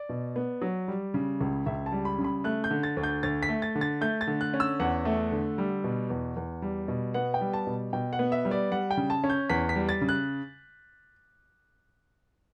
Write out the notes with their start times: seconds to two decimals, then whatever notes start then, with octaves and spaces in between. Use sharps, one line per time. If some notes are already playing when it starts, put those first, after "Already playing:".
Already playing: D5
0.09 B2
0.36 B3
0.62 F#3
0.88 G3
1.14 C#3
1.41 C#2
1.66 C#2 E5
1.86 A5
1.92 G3
2.05 B5
2.18 C#3
2.24 B5
2.44 A3 F#6
2.64 G6
2.71 D3
2.83 A6
2.97 D2
3.03 G6
3.23 D2 A6
3.43 B6
3.49 A3
3.62 A6
3.75 D3
3.81 A6
4.01 A3 G6
4.21 A6
4.27 D3
4.41 F#6
4.54 C#4
4.60 E6
4.80 E2 F#5
5.05 A3
5.32 D3
5.58 G3
5.84 B2
6.10 E2
6.36 E2
6.62 G3
6.88 B2
7.14 B3 F#5
7.34 G5
7.41 G3
7.53 A5
7.67 B2
7.93 B2 G5
8.13 F#5
8.19 B3
8.32 E5
8.45 G3
8.51 D5
8.71 G3 F#5
8.91 G5
8.97 C#3
9.10 A5
9.24 C#4
9.30 G6
9.50 E2 B6
9.69 B6
9.76 G3
9.89 A6
10.01 C#3
10.09 F#6